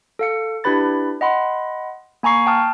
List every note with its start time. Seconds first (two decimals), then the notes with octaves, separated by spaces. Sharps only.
0.19 A4 F5 C#7
0.64 D4 E4 G4 B4 B5 A6
1.21 D#5 F#5 B5 C6
2.23 A#3 G#5 A#5 C#6 C7
2.46 G5 A5 D#6 F6